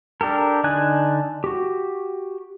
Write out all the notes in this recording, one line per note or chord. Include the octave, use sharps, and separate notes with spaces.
D4 G4 A4 A#4
D3 D4 D#4 G#5 F#6
F#4 G4